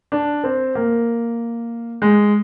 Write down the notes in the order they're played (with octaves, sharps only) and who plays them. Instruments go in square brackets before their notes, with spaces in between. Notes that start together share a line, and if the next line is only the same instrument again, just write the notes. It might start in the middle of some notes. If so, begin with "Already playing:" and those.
[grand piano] D4
C4
A#3
G#3